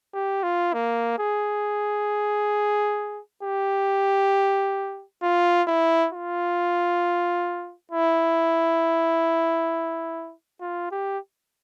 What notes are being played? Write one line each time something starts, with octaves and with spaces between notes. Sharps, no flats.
G4
F4
A#3
G#4
G4
F4
E4
F4
E4
F4
G4